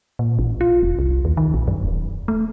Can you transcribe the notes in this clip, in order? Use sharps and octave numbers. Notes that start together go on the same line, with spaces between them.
A#2
A1
F4
E1
C2
D#2
D#3
A#1
F#2
D#1
A3